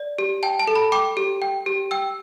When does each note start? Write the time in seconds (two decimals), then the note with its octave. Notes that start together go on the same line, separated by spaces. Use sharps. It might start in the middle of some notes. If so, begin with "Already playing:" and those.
Already playing: D5
0.18 G4
0.43 G5 A5
0.59 A5
0.67 A4
0.75 B5
0.92 G5 D6
1.17 G4
1.42 G5
1.66 G4
1.91 G5 E6